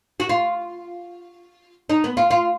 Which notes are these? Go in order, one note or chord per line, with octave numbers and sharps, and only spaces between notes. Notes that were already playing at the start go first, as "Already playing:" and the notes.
F#4
F4
D#4
B3
F4
F4